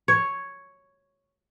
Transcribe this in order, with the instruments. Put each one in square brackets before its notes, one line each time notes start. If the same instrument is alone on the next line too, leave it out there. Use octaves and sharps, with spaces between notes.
[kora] C#5